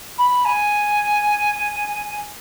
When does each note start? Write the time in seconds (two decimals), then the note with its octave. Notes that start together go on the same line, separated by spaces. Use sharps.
0.18 B5
0.45 G#5